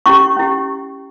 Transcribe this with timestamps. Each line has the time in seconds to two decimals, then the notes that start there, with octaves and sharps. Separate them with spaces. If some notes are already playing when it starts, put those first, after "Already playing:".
0.06 C#4 E4 G4 C#6
0.37 C#4 E4 G4